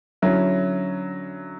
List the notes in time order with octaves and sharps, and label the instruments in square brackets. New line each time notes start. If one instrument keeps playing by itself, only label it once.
[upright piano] D3 F#3 C#4 E4